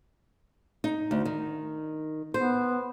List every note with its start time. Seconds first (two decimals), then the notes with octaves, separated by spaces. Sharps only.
0.84 D#4
1.11 D2
1.25 D#3
2.34 B3 C5